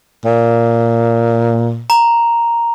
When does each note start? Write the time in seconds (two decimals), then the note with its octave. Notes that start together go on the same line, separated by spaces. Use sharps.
0.25 A#2
1.90 A#5